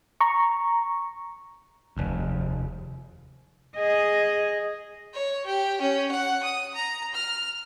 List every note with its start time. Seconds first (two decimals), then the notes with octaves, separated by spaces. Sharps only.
0.21 A#5 C#6
1.97 F1 D#2
3.77 G#4 D#5
5.14 C#5
5.46 G4
5.81 C#4
6.11 F#5
6.43 D#6
6.75 A#5
7.14 F6